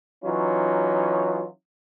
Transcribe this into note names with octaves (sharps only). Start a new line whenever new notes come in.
E3 F#3 C#4 D#4 F4